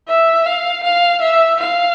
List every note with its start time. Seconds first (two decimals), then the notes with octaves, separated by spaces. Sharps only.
0.08 E5
0.46 F5
0.84 F5
1.22 E5
1.60 F5